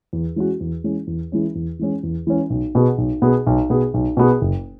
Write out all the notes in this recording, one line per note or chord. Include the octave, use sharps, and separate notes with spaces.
E2
E3 G#3 C#4 F#4
E2
E3 G#3 C#4
E2
E3 G#3 C#4
E2
E3 G#3 C#4
E2
E3 G#3 C#4
B1
B2 B3 G#4
B1
B2 B3 G#4
B1
B2 B3 G#4
B1
B2 B3 G#4
F#1